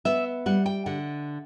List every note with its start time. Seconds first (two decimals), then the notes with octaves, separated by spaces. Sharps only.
0.05 B3 E5
0.46 G3 F#5
0.66 G5
0.86 D3 F#5